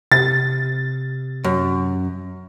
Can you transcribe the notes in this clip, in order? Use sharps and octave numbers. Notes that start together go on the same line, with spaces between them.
C3 A6
F#2